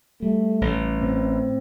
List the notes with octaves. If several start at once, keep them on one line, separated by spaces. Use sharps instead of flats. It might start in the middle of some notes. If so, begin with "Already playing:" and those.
G3 A3
A1
A2 C4